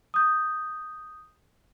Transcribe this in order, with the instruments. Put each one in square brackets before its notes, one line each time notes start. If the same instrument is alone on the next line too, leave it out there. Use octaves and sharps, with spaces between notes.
[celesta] D#6 G6